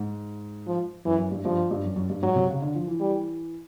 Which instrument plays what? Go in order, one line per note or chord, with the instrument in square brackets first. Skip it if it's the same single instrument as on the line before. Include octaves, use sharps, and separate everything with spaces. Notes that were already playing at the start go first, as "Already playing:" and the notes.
Already playing: [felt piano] G#2
[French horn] F3
[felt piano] F#2 [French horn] E3
[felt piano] F#2
G2
[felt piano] G2 [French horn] F3
[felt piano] G2
F#2
F#2
G2
[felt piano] G#2 [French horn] F#3
[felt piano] C3
C#3
D3
F3
E3
[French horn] G3